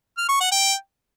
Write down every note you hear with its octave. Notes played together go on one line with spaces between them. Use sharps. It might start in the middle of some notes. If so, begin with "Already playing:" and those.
F6
C#6
F#5
G5